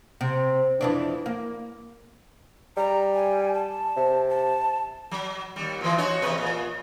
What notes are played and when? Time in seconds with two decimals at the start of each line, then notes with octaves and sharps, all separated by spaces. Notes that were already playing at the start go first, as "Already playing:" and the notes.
0.21 C3
0.81 F2 E3 D4
1.26 A#3
2.77 G3 A#5
3.14 G#5
3.54 A5
3.96 C3
4.29 A5
5.11 F#3
5.56 D#2 G3
5.81 A#2 E3
5.98 D#4 F#4 C#5
6.22 E2 C3 B4
6.38 A#2